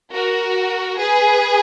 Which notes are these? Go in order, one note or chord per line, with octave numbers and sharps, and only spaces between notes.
F#4 A#4
G#4 B4